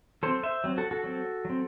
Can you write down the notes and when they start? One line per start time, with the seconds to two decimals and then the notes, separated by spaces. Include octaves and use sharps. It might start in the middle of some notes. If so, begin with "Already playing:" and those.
0.23 F#3 C4 A4 C5
0.43 C5 E5
0.64 F#3 C4
0.78 F#4 A4
0.91 F#4 A4
1.04 F#3 C4
1.45 F#3 C4